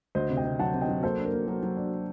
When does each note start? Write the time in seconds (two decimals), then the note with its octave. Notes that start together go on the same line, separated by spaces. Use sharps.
0.15 D2 C5 D#5
0.30 C3
0.37 D#5 G5
0.44 C3
0.59 F#3 F#5 A5
0.74 C3
0.81 D#5 G5
0.88 F#3
1.03 A#3 A4 C5
1.18 D4
1.25 A#4
1.33 A#3
1.47 F#3 A#4
1.63 F#3
1.77 D4